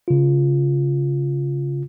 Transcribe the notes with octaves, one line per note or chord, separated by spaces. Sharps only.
C#3 F4